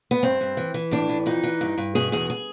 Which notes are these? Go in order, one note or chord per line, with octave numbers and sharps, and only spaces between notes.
B3
G2 C4
G2
E3
E3
A2 D4
E3
F2 D#4
E3
G2
G2
B2 G#4
E2 G#4
G#4